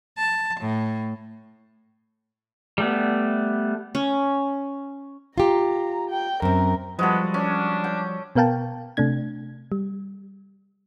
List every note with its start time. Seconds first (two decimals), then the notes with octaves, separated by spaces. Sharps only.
0.17 A5
0.61 A2
2.78 G3 A3 B3
3.95 C#4
5.38 F4 G4 A#5
6.10 G5
6.42 F#2 C4 A#4
6.99 F3 G3 G#3 B3 F#4 A4
7.34 C#4 D4
7.84 G5
8.36 B2 B3 A#4 F5 G5 A5
8.97 C3 A3 D4 G#6
9.72 G3